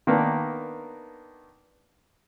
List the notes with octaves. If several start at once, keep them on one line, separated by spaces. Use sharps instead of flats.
D#3 A#3 B3 D4